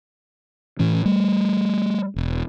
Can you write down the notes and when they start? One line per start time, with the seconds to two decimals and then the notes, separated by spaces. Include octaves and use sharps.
0.79 A2 E3 C#4
1.06 G3 A3
2.16 E1